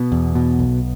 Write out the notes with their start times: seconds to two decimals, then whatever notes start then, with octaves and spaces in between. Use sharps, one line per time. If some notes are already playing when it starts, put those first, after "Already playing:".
Already playing: B2 B3
0.12 E2
0.35 B2
0.59 B1